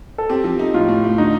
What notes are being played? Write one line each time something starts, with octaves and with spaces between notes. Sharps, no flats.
A4
C4 G4
F3
D#4
A2 F4
A2
A3
D3 D#4